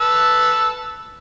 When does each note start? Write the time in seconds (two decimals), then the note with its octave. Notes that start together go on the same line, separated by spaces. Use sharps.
0.01 B4 A5 E6